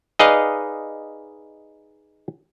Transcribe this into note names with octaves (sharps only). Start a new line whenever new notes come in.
D#4 G#4 B4 D5 D#5 F5